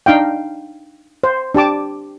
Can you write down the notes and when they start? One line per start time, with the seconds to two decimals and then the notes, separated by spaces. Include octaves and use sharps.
0.06 D4 D#4 F5 G5
1.24 C5
1.55 D4 G4 A5 D6